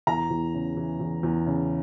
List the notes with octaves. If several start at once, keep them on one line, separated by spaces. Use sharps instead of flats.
E2 A#5
E2
C#3
E3
E2
E2
C#3